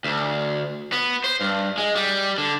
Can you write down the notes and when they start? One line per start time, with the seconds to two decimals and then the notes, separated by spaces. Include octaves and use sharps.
0.04 D2
0.92 B3
1.24 C5
1.41 G2
1.78 G#3
1.95 G3
2.38 D3